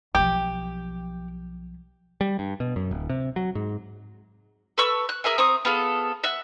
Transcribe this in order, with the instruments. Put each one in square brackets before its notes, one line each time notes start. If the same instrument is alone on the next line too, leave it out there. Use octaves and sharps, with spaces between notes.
[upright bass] B1 F3 [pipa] G4
[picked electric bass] G3
G2
B2
F#2
D1
C3
F#3
G#2
[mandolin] A4 B4 C#6 E6
F#6
G#4 A#4 E5 G#5
C4 A#5 C#6 D#6
B3 F4 G#4 A4
E5 F#5 F#6